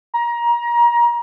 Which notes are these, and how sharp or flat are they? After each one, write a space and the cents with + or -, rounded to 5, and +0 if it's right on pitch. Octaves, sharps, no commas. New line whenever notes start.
A#5 +25